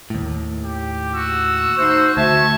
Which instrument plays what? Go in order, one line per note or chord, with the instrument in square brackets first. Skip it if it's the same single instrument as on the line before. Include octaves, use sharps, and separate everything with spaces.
[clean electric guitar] D#2 A2
[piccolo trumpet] G4
[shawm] F#4 [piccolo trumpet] E6
[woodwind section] A3 D#4 C5 [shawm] F#4
[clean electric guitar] D2 [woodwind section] A3 F#4 E5 [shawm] A5 [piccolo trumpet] G#6